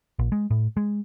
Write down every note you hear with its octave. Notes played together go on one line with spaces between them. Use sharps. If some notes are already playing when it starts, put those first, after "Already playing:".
A#1
G#3
A2
G#3